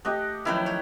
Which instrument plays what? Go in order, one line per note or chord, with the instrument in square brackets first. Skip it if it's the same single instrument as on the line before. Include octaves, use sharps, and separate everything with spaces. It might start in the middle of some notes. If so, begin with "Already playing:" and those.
[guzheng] A3 [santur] G4 D#5 F#5
[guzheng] D#3 F3 F#3 [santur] E4 B4
[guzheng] C#5